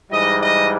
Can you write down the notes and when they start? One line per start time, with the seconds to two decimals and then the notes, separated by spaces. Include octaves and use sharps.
0.11 G#2 E3 G3 D#5
0.41 D#5